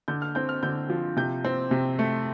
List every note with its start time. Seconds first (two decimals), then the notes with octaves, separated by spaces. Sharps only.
0.08 D3 G6
0.22 F6
0.35 C4 G6
0.49 F6
0.63 D3 G6
0.90 F3
1.17 C3 G6
1.44 C4
1.71 C3
1.99 A3